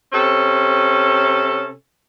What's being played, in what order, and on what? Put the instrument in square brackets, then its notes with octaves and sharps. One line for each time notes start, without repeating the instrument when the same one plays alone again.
[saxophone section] C3 C#4 A4